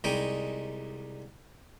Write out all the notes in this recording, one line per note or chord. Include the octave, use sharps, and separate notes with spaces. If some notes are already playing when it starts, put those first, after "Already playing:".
C2 G3 G#3 D#4 G5 G#5